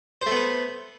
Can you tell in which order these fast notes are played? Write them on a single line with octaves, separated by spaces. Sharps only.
C5 A3 B3 B4